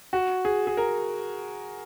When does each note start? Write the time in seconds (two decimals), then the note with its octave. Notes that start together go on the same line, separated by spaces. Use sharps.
0.13 F#4
0.45 G#4
0.67 G#4
0.77 A#4